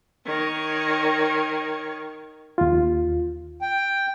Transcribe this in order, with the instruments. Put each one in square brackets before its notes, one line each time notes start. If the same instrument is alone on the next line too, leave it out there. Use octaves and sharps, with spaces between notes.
[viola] D#3 C#5
[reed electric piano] D#2 F4
[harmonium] G5